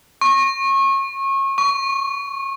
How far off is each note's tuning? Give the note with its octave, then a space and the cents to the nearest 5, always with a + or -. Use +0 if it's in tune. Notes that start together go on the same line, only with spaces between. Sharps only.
C#6 -30
C#6 +20